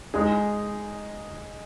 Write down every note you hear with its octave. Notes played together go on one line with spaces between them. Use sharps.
G#3 D#4 G#4